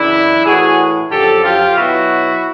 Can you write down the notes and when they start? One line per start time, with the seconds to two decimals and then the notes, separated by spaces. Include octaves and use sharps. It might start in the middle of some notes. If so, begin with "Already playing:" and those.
Already playing: F#2 C#3 E3 D4 E4
0.45 A2 E3 F#4 G#4
1.10 F#2 D3 F3 G4 A4
1.43 F4 G4
1.76 B2 F#3 E4 F#4